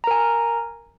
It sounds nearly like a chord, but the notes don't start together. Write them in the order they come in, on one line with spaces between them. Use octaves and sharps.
A#5 A#4 G#5